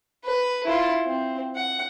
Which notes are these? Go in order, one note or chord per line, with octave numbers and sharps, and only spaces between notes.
B4
E4 F4
C4
F#5